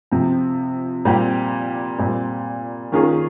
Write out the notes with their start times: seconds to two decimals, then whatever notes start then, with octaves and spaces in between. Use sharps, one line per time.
0.11 C3 F3 C4
1.05 A#2 G3 C4 G4
1.98 A#2 G3 C4 G4
2.92 D#3 A#3 C#4 F4 G#4